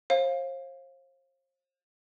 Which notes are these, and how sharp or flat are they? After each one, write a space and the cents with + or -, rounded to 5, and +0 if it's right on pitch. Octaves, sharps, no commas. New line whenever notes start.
C5 +40 F5 +0